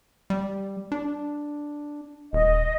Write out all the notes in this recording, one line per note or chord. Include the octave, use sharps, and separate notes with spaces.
G3
D4
D#1 D#5